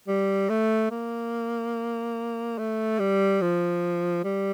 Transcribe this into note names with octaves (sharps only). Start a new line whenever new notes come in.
G3
A3
A#3
A3
G3
F3
G3